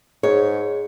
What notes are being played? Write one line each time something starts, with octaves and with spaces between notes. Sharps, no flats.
G#2 G#4 C#5